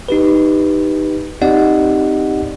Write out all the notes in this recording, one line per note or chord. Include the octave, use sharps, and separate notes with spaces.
D#4 G4 B4
C4 D#4 G4 D5 D#5 F#5